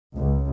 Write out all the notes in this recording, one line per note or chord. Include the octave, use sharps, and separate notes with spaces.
C#2